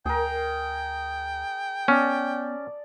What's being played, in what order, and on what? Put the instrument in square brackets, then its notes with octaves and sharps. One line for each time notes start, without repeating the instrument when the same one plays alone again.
[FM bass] D2 [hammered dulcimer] G#4 A#4 [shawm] G5
[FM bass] B3 [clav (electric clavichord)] C#4 [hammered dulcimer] D5 A5